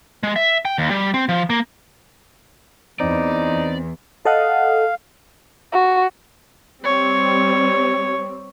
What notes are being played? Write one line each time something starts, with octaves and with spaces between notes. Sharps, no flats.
G#3
E5
G5
D#2
G3
C4
F3
A#3
E2 C4 D#4 D5
A4 D#5 F5 F#5
F#4
G3 C4 C#5